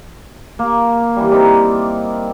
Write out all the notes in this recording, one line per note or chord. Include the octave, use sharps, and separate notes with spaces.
A#3
E3 G3
C4 D#4 A#4 D5